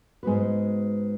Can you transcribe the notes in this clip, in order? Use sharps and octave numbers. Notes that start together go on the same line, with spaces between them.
G#2 G#3 B3 F#4 B4